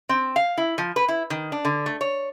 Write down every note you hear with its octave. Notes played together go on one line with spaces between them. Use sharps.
C4
F5
E4
F3
B4
E4
D#3
D4
D3
A3
C#5